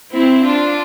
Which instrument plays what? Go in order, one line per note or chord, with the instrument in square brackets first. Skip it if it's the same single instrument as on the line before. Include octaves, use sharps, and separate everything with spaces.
[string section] C4 E4
D4 F4